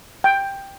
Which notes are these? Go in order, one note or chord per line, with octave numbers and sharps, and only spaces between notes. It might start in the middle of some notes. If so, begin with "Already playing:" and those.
G5